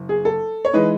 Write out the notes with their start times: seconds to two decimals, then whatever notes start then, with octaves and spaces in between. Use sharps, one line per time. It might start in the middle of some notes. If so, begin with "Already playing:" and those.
Already playing: F#1
0.09 G#4
0.25 A4
0.65 C#5
0.73 E3 G#3 D#4 B4